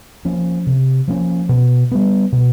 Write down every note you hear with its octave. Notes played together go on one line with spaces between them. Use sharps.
F3 A#3 C#4
C3
F3 A#3 C#4
B2
G3 B3
B2